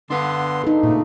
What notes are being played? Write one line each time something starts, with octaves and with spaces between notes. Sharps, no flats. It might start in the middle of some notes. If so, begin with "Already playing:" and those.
D3 B3 D4 B4 C6
D#4 A4
A#2 C#3 A3